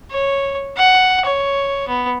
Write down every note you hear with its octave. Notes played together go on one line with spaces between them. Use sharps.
C#5
F#5
C#5
B3